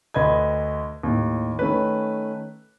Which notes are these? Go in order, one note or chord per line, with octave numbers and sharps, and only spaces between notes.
D2 B4 D#5 B5 G#6
D#2 A2
D#3 A3 C#4 B4